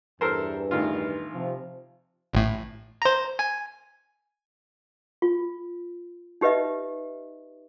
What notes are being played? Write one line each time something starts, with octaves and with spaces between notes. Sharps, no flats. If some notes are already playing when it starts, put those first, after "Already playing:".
E2 G2 E3 A4 A#4 C5
A1 D#3 F4
C3 F3
A1 A2
C5 A#5
G#5
F4
D#4 G4 B4 D#5 E5